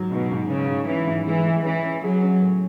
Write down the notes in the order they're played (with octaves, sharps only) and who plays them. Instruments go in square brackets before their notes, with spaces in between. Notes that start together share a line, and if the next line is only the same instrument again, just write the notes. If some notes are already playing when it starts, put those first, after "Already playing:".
Already playing: [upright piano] G#2 F#3
[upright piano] G#2 [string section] B2
[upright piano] G#2
[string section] C#3 [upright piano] C#4
[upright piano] G#2
[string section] E3 [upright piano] C#4
[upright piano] G#2
[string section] E3 [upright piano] G#3
[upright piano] G#3
[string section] E3 [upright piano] C#4
[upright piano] C#4
[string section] F#3 [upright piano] G#4
[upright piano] C#4
A2